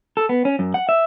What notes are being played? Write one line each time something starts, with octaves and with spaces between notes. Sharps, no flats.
A4
B3
C#4
F#2
F#5
E5